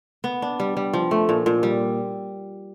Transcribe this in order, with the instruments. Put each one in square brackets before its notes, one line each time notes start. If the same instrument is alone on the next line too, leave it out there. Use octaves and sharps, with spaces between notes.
[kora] B3
D4
G3
G3
F3
A3
A#2
A#2
G3